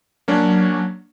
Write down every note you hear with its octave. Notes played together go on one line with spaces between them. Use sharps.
F#3 A#3 C#4 D4